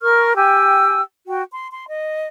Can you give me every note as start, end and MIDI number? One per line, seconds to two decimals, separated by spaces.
0.01 0.33 70
0.01 0.33 85
0.01 0.33 89
0.36 1.01 67
0.36 1.01 79
0.36 1.01 80
0.36 1.01 88
1.27 1.43 66
1.27 1.43 79
1.51 1.67 84
1.71 1.84 84
1.87 2.27 75